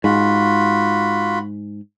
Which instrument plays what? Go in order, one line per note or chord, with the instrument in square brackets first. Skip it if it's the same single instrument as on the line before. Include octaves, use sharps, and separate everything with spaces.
[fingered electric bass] G#2 [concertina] F4 F#4 B5